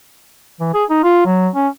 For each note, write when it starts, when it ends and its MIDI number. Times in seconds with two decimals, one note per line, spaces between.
0.60 0.70 52
0.74 0.84 68
0.90 0.99 63
1.04 1.23 65
1.25 1.48 54
1.55 1.68 61